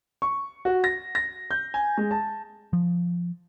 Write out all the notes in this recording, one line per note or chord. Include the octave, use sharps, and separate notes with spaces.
C#6
F#4
A#6
A#6
G6
G#5
G#3
A5
F3